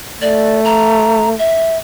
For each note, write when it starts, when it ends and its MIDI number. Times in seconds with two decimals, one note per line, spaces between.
0.22 1.33 57
0.22 0.60 74
0.64 1.29 82
1.39 1.77 76